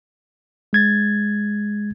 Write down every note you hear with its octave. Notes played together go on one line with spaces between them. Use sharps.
G#3 G#6 A6